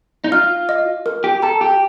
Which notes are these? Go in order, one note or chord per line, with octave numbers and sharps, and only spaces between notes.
D#4
F4 F6
D#5
A#4
G4
A4 A#5
G4